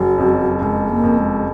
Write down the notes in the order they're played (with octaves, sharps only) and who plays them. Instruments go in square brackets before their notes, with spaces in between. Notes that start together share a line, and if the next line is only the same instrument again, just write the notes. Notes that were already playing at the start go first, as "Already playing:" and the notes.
Already playing: [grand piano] F#1 [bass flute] F#3
[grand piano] F2
[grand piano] F#1 [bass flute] G#3
[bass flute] A#3
[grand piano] F2
[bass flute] G#3